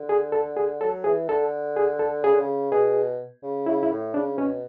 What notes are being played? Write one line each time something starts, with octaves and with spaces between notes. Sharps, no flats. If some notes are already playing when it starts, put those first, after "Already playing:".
Already playing: D3
G#4
A4
G#4
F#3 A4
E3 G#4
D3 A4
G#4
A4
C#3 G#4
D3
C#3
B2 G#4
C#3
C#3 E4
E4
A2
C#3 D4
B2 C#4